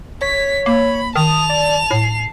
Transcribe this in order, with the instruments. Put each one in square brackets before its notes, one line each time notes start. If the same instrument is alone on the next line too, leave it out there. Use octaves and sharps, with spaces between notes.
[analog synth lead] C#5 [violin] B6
[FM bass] A#3 [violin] B5
[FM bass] D#3 [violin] A5 F7 [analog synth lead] D#6
[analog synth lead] D5
[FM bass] A2 [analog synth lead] C7